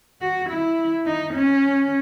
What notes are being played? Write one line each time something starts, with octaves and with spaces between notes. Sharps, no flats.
F#4
E4
D#4
C#4